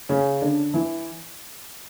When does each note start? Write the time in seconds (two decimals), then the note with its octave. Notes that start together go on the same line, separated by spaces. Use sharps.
0.09 C#3 C#4
0.41 D3 D4
0.74 E3 E4